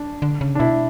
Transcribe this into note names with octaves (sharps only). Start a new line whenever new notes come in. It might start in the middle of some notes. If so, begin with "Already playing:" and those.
Already playing: D4
D3
C#3
D4
B2 E4